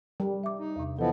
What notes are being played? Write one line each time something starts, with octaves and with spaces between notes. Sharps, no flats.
G3
E5 D6
D#4
E2 C3
E3 F3 B3 A4 D#5